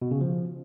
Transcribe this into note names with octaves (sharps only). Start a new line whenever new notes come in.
B2
C#3
F3